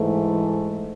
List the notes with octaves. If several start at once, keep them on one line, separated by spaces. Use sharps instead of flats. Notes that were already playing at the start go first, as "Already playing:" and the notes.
Already playing: G#2 E3 A3